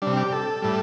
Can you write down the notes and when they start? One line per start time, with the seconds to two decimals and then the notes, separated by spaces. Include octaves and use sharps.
0.02 C3 G3 D4
0.17 G4
0.32 A4
0.62 A2 G3